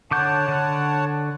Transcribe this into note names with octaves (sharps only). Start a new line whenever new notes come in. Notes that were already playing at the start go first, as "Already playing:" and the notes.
D3 C#5 F#5 A5 D6 G6
D3 F#6